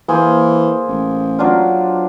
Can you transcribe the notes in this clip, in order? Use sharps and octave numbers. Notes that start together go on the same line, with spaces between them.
E3 A#3 G#4 C5
A1
F#3 D4 F4